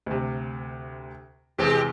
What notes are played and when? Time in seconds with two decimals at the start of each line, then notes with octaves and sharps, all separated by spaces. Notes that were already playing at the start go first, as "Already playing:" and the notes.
0.06 D2 C3
1.58 E2 C3 G#3 C4 G4